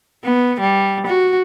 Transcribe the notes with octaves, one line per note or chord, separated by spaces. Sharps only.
B3
G3
F#4